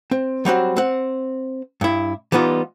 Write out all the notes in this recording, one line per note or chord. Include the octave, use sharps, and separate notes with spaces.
C4
F#3 G3 C4 F#4
C4 F#5
G2 E4
E3 G3 B3 D#4 F4